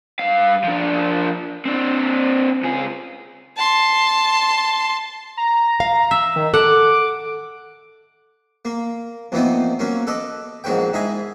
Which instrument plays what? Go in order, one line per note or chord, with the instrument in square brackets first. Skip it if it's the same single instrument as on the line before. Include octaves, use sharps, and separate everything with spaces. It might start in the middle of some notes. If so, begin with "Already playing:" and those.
[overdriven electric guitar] G2 F5
F3 D4
C4 D4
C#2 G#4
[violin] A5 C6
[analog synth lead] A#5
[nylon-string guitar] F5
[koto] E5
[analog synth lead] D#3
[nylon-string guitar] A4 [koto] F#5 [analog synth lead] D6
[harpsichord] A#3
F2 A#2 E3 B3 C4 D#4
F#3 A#3 C#4
A4 B4 D5 D#5
A#1 G#2 F#3 F#4 B4 G5
G#2 E4 D#5 G#5 B5